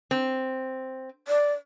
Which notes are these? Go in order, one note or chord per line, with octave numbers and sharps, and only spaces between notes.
C4
D5